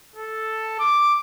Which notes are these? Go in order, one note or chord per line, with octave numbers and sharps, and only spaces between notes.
A4
D6